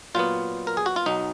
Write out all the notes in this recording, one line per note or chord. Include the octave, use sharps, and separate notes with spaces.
A#2 F#3 B3 F4
A#4
G#4
F#4
F4
B1 B2 F#3 D#4